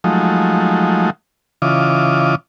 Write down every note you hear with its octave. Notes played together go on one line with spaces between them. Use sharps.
F3 F#3 G#3 A3 D#4
C#3 E3 F4 D#5 D6